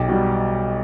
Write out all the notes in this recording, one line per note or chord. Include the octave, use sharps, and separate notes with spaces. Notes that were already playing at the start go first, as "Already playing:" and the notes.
Already playing: B1 G4
B2 G3